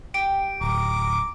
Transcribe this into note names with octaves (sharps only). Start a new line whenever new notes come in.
G4 D7
D1 A#5 D6